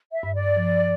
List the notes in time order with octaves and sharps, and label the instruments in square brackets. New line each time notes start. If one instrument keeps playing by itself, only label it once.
[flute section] E5
[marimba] G2
[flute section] D5
[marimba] F3